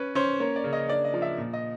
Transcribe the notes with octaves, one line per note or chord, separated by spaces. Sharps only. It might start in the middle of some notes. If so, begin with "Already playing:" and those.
Already playing: C#4 B4
C#4 C5
A#3 C#5
D5
C#3
D#5
D4 D5
D#5
F3
E5
A#2
D#5